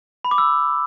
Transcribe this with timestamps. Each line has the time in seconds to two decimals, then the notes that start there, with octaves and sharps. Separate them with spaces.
0.25 B5
0.31 D6
0.38 E6